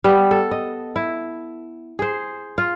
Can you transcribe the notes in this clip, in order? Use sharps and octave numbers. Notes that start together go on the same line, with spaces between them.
G3 B3
A4
D#5
E4
G#4 C5
F4